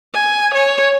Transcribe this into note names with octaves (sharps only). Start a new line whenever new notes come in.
G#5
C#5